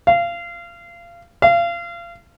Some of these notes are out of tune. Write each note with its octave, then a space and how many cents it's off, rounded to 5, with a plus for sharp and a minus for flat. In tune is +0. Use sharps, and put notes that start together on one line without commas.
F5 -25
F5 -30